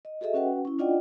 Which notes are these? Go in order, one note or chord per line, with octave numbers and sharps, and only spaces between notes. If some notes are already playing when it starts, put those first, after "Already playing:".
D#5
F#4 G#4 A4 D#5 E5
C#4 F#4 B4 F#5 G5
C#4 E4
D4 F4 D5 D#5 F#5 G5